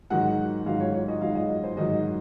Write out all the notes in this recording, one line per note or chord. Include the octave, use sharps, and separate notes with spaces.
G#2 D#3 F#3 F#5
G#2 D#3 F#3 F5
C#5
C#5
D#5
G#2 D#3 F#3 F5
D#5
C5
G#2 D#3 F#3 D#5